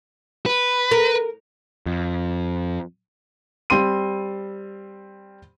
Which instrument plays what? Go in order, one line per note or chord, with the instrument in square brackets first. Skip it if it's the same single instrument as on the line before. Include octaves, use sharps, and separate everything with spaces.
[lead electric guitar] B4
[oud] A#4
[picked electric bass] F2
[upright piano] G3 C4 C6 D#7